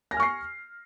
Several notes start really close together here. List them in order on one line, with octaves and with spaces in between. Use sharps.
A#6 G#5 F6 C#6 C7